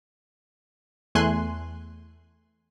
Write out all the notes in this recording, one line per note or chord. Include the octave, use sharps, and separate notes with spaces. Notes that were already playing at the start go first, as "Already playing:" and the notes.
E2 A3 G#5 C6 F#6